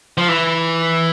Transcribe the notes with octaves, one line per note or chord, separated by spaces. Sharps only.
F3
E3